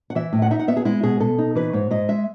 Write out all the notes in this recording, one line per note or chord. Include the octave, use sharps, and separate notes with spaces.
F#5
E3 E5
A2
F#5
D#4 E5
F#5
B3 E5
G#4
G#3 E4
B2 G#4
B2 A4
D#4
E3 B4
G#2 C#5
G#2 D#5
G#3 E5